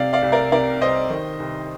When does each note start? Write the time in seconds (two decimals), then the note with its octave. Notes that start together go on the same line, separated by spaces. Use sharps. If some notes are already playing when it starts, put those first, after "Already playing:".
Already playing: C3 D5 F5
0.13 D5 F5
0.22 C2
0.32 A#4 D5
0.52 C3 A#4 D5
0.81 C2 C5 D#5
1.10 D#3
1.40 C2